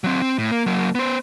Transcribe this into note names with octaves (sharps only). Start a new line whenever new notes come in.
F#3 C4
C4
A2
A#3
F#3 A#3
B3 C5